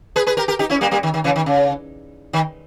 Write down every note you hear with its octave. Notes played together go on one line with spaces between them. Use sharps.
G#4 B4
G#4 B4
G4 A#4
G4 A#4
D#4 G4
C#4 E4
G3 A#3
G3 A#3
D#3
D#3
C#3 E3
D#3
C#3
D#3